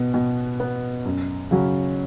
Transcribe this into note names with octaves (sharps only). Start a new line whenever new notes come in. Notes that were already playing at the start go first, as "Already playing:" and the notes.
Already playing: B2 B3
B2
B3
F#2
C#3 F#3 C#4